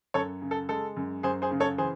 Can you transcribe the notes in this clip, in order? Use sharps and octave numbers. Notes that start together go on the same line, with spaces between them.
F#2 A4 C#5
C#3
A4
G#3 A4
F#2
F#2 G#4 C5
G#4 C5
C#3
A4 C#5
E3 G#4 C5